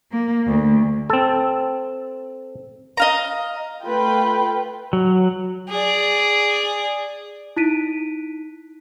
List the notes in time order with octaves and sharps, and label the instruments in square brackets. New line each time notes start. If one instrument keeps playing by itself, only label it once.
[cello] A#3
D2
[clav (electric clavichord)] C4 A4
[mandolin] D#5 F5 A#5
[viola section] A3 F4 B4 G5
[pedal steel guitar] F#3
[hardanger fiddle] G#4 D5
[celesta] D#4 E4 F#6 B6 D7 D#7